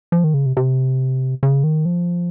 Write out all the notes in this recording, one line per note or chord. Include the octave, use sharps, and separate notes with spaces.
F3
D#3
C#3
C3
C3
C#3
D#3
F3